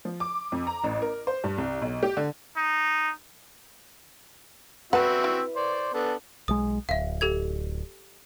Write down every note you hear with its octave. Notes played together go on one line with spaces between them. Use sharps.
F3
D6
F2
A#5
A1
A#4
C5
G2
C2
B1
G4
D3
D#4
C4 F#4 B4 E5 F#5 A5
E4
C5 D5
B3 D4 A4
B1 G#3 D#6
D1 E5 F5
G4 A4 G#6